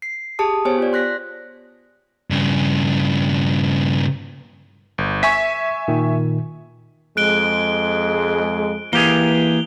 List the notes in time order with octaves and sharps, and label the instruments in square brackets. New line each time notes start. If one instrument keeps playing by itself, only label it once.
[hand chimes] C7
G4 G#4 A5 D#6
B3 G4 C5 C#5 G#5
F4 D5
C6 F#6 A#6 B6
[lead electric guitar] G2 C#3
[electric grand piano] G1
[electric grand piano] E5 G#5 C#6 [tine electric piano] B6
[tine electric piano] A#2 D#3
[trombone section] F2 G#3 [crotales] F#6 D7 G7
[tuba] E3 [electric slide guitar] A#3 G4 G#4 [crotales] F7 G7